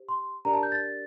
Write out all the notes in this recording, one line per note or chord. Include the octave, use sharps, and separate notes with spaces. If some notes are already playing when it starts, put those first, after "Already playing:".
Already playing: G4 C5
C6
D4 G4 A#4 D5 A#5
A5
G6
A6